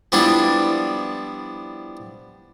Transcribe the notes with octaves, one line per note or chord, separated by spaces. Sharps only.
F3 G3 B3 D4 E4